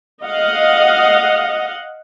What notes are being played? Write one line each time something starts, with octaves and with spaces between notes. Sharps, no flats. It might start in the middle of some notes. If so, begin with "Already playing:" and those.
D#5 F5 F#5